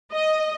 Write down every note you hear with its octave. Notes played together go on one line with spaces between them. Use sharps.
D#5